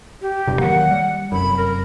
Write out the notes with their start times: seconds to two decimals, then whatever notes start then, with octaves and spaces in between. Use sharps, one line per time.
0.22 G4
0.47 E1 G2 C3
0.60 D#3 F#3 A#3 F#5
0.91 G3
1.32 F1 F#2 B5
1.57 A#4